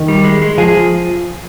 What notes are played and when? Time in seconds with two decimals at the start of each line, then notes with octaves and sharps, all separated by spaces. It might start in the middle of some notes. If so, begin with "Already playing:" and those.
Already playing: D#3 D#4
0.08 G3
0.24 G#3
0.42 G#3
0.57 F3 F4 G#4